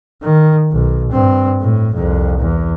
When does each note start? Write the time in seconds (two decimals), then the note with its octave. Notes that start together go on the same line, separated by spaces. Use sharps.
0.23 D#3
0.72 B1
1.13 G2 C4
1.61 A2
1.95 C2 F2
2.40 E2